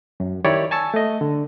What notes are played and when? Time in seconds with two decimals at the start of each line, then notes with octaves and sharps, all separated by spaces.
0.20 F#2
0.45 D#3 E4 G4 C#5 D5
0.71 G#5 A5 C#6 E6
0.94 A3 D#5
1.21 D3